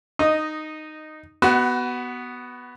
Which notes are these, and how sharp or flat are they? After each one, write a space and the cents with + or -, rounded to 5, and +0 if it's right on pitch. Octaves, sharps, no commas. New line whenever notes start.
D#4 -10 D#5 +0
B3 +0 F#4 +25 B4 +0